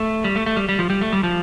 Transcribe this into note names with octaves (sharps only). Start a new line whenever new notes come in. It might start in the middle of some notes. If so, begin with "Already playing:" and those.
Already playing: A3
G3
A3
A3
G3
G3
F3
G3
A3
G3
F3